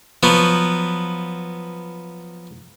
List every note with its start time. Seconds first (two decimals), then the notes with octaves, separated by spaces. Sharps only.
0.23 F3 F#3 B3